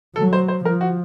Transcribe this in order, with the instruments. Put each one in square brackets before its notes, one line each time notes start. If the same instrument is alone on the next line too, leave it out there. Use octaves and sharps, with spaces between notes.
[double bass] F#3 [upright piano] A4
[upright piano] C5
C5
[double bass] F3 [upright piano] A#4
[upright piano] F#4